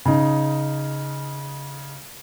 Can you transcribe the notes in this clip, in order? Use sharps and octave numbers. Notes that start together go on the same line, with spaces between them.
C#3 D#4